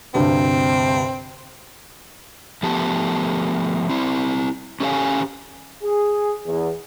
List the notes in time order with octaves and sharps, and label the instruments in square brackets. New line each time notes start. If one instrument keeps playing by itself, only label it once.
[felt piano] D2 G2 C3 [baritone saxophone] C4
[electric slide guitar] F3 A3 B3 G4 A5
C4 E4
C#4 G4 A4 C#5 F5 G#5
[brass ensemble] G#4
E2